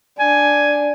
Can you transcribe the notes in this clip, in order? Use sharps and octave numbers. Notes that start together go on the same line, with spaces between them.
D4 G#5